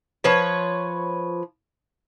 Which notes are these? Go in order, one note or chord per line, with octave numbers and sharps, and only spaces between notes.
F3 B4 C#5